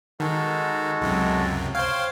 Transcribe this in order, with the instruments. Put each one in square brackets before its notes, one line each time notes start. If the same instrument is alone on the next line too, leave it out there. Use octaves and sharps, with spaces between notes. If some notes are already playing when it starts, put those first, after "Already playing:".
[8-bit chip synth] D#3 [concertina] G#3 F#4 A4
[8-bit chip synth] C#2 F#2 C3
[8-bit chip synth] C5 F5 [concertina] C#5 G5